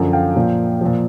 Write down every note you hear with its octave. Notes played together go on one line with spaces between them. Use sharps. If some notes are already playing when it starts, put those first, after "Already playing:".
Already playing: F#2 D3 F3
F5 G5
A#2 F3
A#2 F3